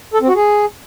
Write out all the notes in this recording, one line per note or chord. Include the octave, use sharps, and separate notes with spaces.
A4
C4
F#4
G#4